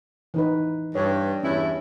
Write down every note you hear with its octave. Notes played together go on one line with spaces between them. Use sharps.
E3 D#4 B4
G2 B4 C#5
E2 G2 C#4 E4